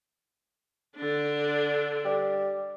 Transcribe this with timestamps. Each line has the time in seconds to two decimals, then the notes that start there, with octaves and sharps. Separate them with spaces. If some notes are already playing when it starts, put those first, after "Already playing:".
0.96 D3 D4
2.05 G3